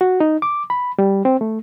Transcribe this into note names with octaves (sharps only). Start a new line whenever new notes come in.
F#4
D#4
D6
B5
G3
C4
A3